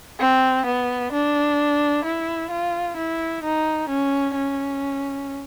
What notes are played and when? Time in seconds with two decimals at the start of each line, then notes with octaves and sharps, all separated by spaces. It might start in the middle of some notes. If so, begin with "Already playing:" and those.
0.20 C4
0.65 B3
1.12 D4
2.04 E4
2.51 F4
2.97 E4
3.43 D#4
3.89 C#4
4.36 C#4